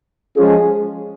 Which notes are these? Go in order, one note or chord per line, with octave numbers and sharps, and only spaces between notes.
F3 G#3 C#4 F4 G#4